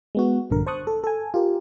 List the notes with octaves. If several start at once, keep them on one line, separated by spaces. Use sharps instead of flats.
G#3 B3 F#4
A#1 G2 D3 A#4
C5 A5 C#6 D#6 F#6
A4
A4 G#5
F4 G4 A#4